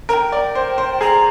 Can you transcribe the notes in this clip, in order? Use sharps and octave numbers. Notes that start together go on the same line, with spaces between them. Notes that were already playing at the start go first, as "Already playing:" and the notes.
A#4 G5 A#5
D5
C5
C5
G#4 A#5